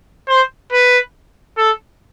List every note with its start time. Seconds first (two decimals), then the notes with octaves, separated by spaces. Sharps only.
0.28 C5
0.72 B4
1.58 A4